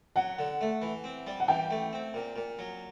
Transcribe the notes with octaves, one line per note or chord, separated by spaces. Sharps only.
F#3 F#5
D3
A3
E3
C4
G3
F#5
E3 G5
A3
C4
A#2
A#2
F#3